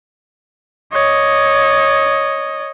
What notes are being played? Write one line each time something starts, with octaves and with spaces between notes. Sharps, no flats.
C#5 D#5